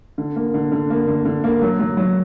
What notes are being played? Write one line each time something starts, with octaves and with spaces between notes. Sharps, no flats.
D3
A#3
D3
D3
A#3
D3
D3
A#3
F#3
F#3
F#3